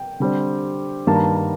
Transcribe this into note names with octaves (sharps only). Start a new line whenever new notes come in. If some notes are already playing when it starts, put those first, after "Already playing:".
Already playing: G5
D3 G3 C4
G2 D#3 G3 A#3 A5
A#5
A5
A5